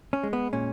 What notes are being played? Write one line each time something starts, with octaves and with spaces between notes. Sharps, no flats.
C#4
G#3
B3
A#2 C#4